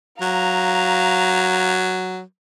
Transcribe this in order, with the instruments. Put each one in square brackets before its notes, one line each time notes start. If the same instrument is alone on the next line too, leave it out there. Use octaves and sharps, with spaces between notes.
[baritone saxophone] F#3 [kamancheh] F5 A#5